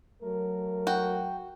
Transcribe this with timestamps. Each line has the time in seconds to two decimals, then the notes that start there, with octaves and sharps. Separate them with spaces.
0.21 F#3 A3 A#4
0.87 F#4 G5